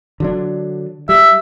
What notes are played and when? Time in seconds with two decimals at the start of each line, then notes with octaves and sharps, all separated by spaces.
0.20 D3 F#3 D4
1.09 G3 E5